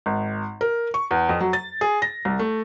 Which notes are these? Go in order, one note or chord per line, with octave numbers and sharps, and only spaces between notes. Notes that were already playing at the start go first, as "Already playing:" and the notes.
G#1
A#4
C#6
E2
F2
F#3
A6
G#4
A#6
C2
A3